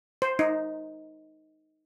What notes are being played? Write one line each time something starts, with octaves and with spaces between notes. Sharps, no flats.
C5
D#4